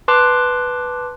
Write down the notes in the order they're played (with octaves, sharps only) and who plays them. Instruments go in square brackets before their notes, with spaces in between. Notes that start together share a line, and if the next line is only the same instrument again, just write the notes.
[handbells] B4 A5 C6 D6 F#6